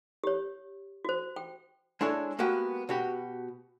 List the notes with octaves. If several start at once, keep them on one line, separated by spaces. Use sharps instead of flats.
G4 C#5
F#4 C5
G5
G#3 D4 E4 A4 C#5
G#3 A#3 B3 F#4 G4
B2 F#4 G4